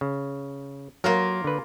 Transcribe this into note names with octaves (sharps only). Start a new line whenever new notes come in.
C#3
F#3 A#3 F4 A#4
D3 B4